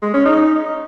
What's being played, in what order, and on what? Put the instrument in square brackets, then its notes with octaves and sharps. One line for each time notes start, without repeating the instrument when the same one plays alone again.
[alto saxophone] G#3
C#4
D#4